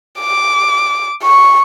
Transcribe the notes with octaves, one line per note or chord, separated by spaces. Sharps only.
D6
C#6